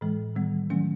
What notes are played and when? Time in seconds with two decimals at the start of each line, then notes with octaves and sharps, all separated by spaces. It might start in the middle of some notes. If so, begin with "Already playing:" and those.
0.01 A2 E3 G#3
0.36 D#3 G3 B3
0.70 D#3 F#3 A3 C#4